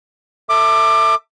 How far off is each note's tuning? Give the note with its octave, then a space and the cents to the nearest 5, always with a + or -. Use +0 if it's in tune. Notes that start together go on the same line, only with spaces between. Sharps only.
A4 +30 E5 -5 D6 +20